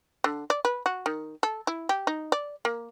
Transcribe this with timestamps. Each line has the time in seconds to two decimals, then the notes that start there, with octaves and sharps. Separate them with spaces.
0.24 D3
0.50 D5
0.65 B4
0.86 F#4
1.06 D#3
1.43 A4
1.67 E4
1.89 G4
2.07 D#4
2.32 D5
2.65 A#3